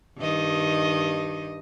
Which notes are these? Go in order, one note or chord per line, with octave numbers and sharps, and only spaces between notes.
G2 D#3 D#5